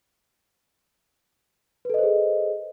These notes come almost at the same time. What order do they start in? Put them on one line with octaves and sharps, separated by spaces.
B4 A4 D#5 C5 G#4